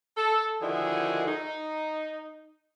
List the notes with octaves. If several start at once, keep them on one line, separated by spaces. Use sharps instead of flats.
A4
D3 D#3 F3 E4 F#4 G#4
D#4